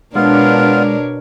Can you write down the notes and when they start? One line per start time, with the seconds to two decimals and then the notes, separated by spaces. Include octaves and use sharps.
0.15 B2 G#3 B3 D4 F4 A#4 C#5